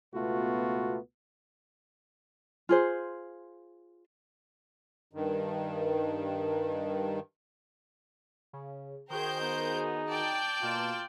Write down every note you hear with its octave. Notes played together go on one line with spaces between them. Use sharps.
C#2 B2 A3 B3 F4 F#4
F4 G#4 C5
G2 D#3
C#3
D#3 F#4 G#4 A#4 C5 G5 G6
B3 D#4
D5 G5 A5 G6
B2 A#3 F4 E7